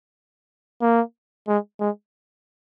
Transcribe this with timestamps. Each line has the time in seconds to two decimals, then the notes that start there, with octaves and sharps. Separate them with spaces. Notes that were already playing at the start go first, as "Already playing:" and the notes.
0.82 A#3
1.48 G#3
1.80 G#3